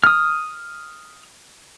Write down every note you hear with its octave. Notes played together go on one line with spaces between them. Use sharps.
D#6 F6